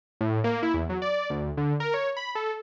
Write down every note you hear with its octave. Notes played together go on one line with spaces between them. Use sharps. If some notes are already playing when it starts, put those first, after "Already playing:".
A2
A#3
E4
E2
F#3
D5
D2
D3
A#4
C#5
B5
A4